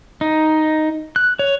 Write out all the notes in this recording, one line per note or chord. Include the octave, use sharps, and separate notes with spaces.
D#4
F#6
C#5